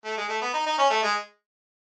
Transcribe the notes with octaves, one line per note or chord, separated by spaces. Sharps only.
A3
G#3
A3
B3
D#4
D#4
C#4
A3
G#3